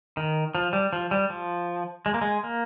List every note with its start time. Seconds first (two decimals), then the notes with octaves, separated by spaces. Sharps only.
0.17 D#3
0.55 F3
0.73 G3
0.93 F3
1.11 G3
1.30 F3
2.06 G#3
2.14 A#3
2.21 G#3
2.44 A#3